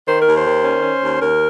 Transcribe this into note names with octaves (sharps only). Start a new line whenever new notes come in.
D#3 C5
D#2 A#4
C5
D#3
C#4
C#4
D#2
D#2 A#4